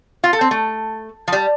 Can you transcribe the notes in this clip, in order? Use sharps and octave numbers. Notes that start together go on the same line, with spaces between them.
F4
A4
C4
A3
F3
G3